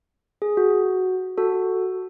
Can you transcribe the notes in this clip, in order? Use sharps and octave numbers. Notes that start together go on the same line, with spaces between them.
G#4
F#4
F#4 A4